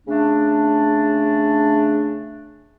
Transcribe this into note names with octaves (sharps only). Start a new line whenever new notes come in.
C#3 A3 D4